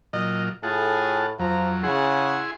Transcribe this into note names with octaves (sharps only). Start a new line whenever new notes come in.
A#2 F#3 F4 D#5
A2 F4 G#4 A4 F#5
F2 F3 F#3 A#5
C#3 E4 G#4 F#5 C6